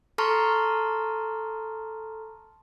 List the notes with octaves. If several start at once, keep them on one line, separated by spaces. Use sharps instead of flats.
A4 A5 A#5 C6 C#6 F6